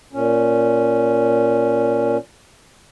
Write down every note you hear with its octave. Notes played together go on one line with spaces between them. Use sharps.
A#2 C#4